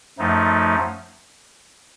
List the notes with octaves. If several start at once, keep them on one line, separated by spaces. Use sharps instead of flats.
F#2 F3 A3 D#4